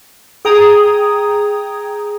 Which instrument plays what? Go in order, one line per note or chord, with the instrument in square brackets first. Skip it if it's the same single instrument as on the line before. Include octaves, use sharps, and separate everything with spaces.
[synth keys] G#4 G5 A#5 D#6